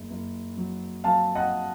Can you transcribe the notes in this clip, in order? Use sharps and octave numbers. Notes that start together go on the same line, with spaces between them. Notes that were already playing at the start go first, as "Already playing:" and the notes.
Already playing: F#1
F#1
F#3
F#3 F5 A5
D#5 F#5